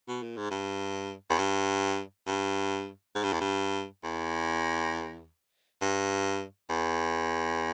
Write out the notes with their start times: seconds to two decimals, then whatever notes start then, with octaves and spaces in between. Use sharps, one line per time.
0.08 B2
0.23 A#2
0.37 G#2
0.51 G2
1.30 E2
1.39 G2
2.27 G2
3.15 G#2
3.24 G2
3.33 E2
3.41 G2
4.04 E2
5.81 G2
6.69 E2